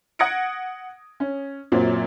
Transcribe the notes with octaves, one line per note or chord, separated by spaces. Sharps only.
F#5 D#6 G#6 A#6 C#7 D7
C#4
F#2 A#2 F#3 C4